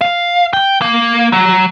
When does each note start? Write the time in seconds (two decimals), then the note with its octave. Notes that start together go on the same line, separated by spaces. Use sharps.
0.01 F5
0.53 G5
0.82 A#3
1.32 F#3